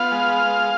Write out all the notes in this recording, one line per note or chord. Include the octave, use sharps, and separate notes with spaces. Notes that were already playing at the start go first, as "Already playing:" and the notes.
Already playing: B3 F4 F5
G#3